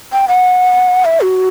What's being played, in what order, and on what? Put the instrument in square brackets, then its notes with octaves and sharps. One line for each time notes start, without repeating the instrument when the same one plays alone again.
[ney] G5
F#5
E5
F#4